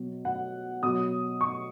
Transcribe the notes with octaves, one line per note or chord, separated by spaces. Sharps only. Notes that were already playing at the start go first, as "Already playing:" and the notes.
Already playing: B2 F#3
F#5
B2 F#3 D#6
C#6